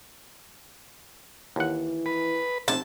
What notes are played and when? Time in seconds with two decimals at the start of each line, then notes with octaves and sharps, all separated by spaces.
1.56 D#2 E3 F#5
2.06 B4
2.68 F1 C3 A5